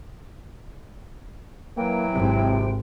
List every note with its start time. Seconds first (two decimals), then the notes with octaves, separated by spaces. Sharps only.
1.77 E3 F#3 A#3 G5
2.13 G#1 C3